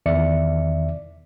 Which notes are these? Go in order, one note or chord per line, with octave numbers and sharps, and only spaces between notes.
E2 D#3 D5 E5 C#7